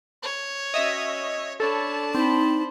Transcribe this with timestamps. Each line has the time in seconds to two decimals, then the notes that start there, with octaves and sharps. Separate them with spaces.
0.23 C#5
0.74 C#4 F#4 D#5 E5
1.60 D4 A4 C#5 A5 B5
2.14 C4 D#4 C5 B5